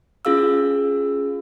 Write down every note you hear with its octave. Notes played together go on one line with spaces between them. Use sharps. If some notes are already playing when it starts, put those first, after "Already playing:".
C#4 F4 G#4 F5 E6